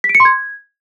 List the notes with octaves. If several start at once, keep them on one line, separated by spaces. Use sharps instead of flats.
B6
D7
C#7
C6
G#6